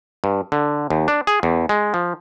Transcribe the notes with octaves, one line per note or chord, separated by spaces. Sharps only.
G2
D3
D#2
D4
G#4
E2
G#3
F3